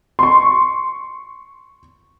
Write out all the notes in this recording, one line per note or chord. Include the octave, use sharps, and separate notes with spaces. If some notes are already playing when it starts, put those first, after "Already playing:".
C6 C#6